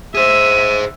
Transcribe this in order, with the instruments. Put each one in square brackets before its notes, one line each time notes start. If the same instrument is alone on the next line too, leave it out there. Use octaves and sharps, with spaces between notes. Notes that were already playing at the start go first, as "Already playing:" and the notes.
[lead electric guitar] G#4 C5 [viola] E5 [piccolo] D#7